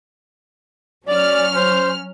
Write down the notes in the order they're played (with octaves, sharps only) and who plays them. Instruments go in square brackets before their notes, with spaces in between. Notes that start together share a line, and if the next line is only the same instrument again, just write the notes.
[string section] F#3 C#4 F6 [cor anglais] D5
[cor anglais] C5